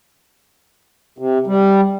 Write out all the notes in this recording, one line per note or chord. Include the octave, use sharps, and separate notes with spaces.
C3
G3